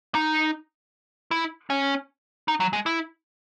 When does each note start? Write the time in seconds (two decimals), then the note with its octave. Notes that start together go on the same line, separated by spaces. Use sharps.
0.15 D#4
1.31 E4
1.70 C#4
2.48 D#4
2.60 F#3
2.73 G#3
2.86 E4